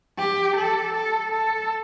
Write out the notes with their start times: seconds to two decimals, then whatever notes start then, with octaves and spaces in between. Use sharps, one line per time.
0.18 G4
0.56 A4
0.94 A4
1.32 A4